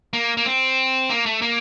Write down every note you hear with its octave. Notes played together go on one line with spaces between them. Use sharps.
A#3
A#3
C4
A#3
A3
A#3